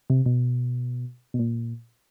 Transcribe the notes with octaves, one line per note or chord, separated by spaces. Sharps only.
C3
B2
B2
A#2